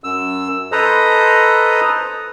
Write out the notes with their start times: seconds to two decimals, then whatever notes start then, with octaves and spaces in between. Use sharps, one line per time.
0.04 F#2 E6
0.72 A4 B4 C5 D#5 A#5 D#6